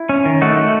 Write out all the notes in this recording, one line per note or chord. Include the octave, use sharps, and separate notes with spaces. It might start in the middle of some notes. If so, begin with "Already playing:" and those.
Already playing: E4
C#4
D#3
A3 D#4 F#4
A3